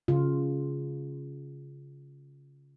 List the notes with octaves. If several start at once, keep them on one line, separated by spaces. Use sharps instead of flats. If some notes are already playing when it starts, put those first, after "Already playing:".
C#3 F4